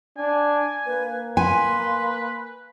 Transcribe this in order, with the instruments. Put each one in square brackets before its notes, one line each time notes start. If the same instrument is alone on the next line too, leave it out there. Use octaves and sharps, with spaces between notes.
[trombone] D4 [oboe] G#5
[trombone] A#3 [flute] B4
[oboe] B4 [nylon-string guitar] G#5 [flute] C6